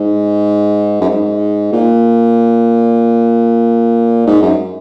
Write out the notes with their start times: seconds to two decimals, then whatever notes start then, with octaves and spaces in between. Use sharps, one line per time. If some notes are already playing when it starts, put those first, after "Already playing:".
Already playing: G#2
1.01 F#2
1.10 G#2
1.72 A#2
4.27 G#2
4.42 F#2